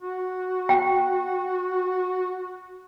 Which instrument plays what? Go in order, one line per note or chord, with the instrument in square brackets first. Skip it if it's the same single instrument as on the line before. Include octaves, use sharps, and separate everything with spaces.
[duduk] F#4
[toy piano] G5